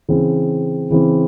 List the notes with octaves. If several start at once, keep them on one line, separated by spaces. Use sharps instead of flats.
C#3 E3 C4
C#3 E3 C4